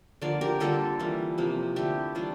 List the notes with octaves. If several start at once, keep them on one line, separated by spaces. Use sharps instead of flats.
D3 F3 A#3 D5 F5
G4 A#4
D3 G3 A#3 F4 A4
E3 G3 A#3
C3 F3 A#3
D3 A3 E4 G4
E3 G3 A#3 D4 F4